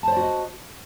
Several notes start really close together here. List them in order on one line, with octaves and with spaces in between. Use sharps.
A5 C5 D5 F#4 D#5